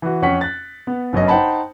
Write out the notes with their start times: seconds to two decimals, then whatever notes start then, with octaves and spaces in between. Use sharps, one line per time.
0.02 E3 F#4
0.22 F2 C#4 F#5 C#6 B6
0.41 F#6 A6
0.87 B3
1.13 G1 F#2 C#4 D#5
1.28 D#4 C5 F#5 G5 A5 B5